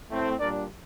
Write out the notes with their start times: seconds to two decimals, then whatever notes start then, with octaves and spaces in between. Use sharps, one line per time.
0.09 A2 A3 C4
0.40 A#2 G3 D4 A#4 D5